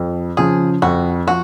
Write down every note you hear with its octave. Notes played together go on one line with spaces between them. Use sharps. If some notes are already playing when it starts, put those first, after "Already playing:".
Already playing: F2
C#3 F3 G#4
F2 F#4
F3 F#4